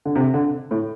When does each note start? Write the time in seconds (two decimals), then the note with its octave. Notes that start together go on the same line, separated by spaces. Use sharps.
0.05 D3
0.15 C3
0.34 D3
0.71 A2